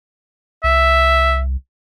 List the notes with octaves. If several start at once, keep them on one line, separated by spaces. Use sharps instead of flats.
C2 E5